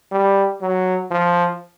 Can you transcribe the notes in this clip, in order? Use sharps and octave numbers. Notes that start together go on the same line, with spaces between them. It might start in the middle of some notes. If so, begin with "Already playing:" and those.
G3
F#3
F3